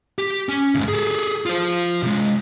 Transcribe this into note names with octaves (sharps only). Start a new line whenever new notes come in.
G4
C#4
D2 G#2
G#4 A4
F4 C5
C3 G#3